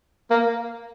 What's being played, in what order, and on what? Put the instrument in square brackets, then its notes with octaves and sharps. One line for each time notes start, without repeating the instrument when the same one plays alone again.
[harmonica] A#3